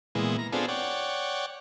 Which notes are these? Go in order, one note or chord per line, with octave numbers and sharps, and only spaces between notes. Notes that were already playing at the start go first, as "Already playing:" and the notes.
A#2 E3 G#3 B3
A#5
B3 C4 D4 F4 G#4 A4
C#5 D5 F#5 G5